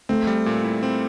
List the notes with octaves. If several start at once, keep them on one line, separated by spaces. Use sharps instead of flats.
A3 C4
G3
A#2
E4
C4